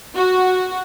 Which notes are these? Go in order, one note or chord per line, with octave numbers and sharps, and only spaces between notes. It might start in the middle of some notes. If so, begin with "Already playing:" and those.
F#4